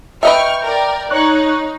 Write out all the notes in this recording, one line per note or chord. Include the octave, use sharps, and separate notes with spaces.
B4 D#5 E5 G5 C#6 F6
A#4 D5
D#4 C#5 C#6 F#6